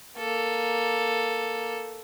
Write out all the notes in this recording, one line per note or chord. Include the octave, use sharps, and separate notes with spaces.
A#3 A4